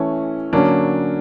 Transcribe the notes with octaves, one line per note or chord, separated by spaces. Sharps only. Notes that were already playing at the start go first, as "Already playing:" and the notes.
Already playing: E3 A3 C#4
D3 F#3 A#3 C#4 D4